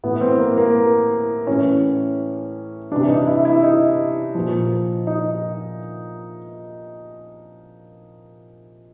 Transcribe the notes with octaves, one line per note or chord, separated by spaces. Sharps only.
A2 E3 B3
C4
A#3
A#3
A2 E3 C#4
C3 E3 D4
D#4
E4
E4
D#4
A#2 F3
D#4